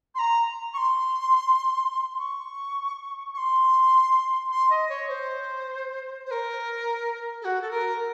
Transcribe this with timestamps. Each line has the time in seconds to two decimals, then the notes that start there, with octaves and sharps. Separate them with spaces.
0.15 C6
0.19 A#5
0.73 C#6
0.77 C6
2.19 C#6
3.34 C#6
3.38 C6
4.51 C6
4.70 D#5
4.89 C#5
5.09 C5
6.26 C5
6.31 A#4
7.41 A4
7.45 F#4
7.61 A4
7.71 A#4